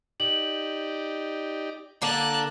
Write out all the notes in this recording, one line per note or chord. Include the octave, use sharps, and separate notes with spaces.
D#4 G4 D5 F#7
D3 A#3 D4 A5 F#6